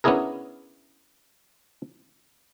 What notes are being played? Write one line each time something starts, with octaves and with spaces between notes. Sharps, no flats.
B3 C#4 D4 E4 G#4 A#4